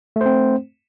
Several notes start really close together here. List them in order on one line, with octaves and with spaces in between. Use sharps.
A3 C5 C4